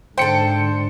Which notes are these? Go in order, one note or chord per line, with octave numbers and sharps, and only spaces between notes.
G#2 D3 A4 C5 G5 C#7